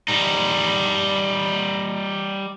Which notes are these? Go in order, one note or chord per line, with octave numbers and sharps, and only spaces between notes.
G3 D#4